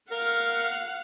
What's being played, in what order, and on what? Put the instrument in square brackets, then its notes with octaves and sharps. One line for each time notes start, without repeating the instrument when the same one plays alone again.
[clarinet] A#4 [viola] F5 F#5